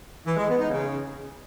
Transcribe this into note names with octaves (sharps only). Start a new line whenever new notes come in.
E3
G#3
B3
D#4
C#3